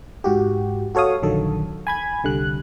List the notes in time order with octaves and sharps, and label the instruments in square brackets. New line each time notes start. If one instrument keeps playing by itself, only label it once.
[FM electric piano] G#2 F#4 G4
F#4 A4 C#5 F5 D#6
A#1 D3 D#3 F#3 A4
G#5 B5 G#6
C2 D3 G3 F#6